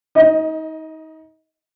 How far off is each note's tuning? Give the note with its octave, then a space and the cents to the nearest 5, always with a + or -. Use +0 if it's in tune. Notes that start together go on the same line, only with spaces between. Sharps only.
D#4 +30 D#5 +0